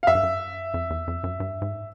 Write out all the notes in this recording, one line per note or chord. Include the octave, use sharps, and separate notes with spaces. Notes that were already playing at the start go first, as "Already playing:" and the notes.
F5
F#2 E5
G2
F#2
F2
E2
F2
F#2
G2
G#2